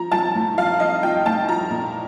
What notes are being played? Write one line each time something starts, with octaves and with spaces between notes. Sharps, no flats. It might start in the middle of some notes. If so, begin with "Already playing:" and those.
Already playing: F3 A#5
F3 A5
A2
F3 F5
F3 D#5
F3 G5
A2 A5
F3 A#5
A#2